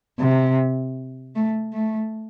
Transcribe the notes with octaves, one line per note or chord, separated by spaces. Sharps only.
C3
A3
A3